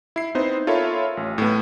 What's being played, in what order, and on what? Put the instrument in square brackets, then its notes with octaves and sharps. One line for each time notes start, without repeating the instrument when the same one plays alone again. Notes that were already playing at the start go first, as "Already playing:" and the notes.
[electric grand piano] E4 C7
B3 C4 D#4 C5
F4 A4 A#4 C#5 E5 B5
A1
A2 B3